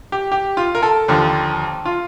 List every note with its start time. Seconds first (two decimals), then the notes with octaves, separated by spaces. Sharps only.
0.12 G4
0.32 G4
0.57 F4
0.75 A#4
0.83 A4
1.08 D#2 D3 F3
1.85 F4